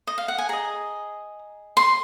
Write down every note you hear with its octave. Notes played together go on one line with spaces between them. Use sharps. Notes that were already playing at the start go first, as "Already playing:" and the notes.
D#5
F5
F#5
G#5
G#4 D#5 A#5
C6